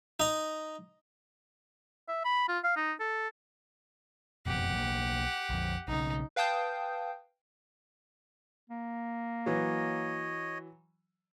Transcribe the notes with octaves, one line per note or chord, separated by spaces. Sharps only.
D#4 A#5
E5
B5
F4
F5
D#4
A4
F#1 F2 B2 G4 F#5
B1 A#3
A#1 F2
B1 C#3 D#4
B4 F5 G5 A5 D#6 G6
A#3
E3 F#3 C#5 D#5